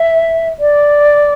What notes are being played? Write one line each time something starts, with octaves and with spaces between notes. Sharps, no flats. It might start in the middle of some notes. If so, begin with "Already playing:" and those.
Already playing: E5
D5